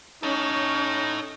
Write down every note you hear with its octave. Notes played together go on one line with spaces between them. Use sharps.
C#4 D#4 A4 C#5